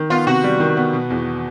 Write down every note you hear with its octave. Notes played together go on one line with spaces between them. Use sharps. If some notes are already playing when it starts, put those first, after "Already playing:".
Already playing: D#3
B3 F4
C3 F#4
G3
D#3
B3
B2
E2